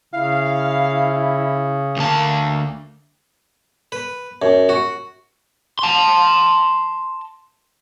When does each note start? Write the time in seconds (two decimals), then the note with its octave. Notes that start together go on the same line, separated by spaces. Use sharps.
0.14 C#3 E4 F5
1.97 D2 A#3 A5
3.92 B4
4.42 F#2
4.69 F#4
5.79 A5 C6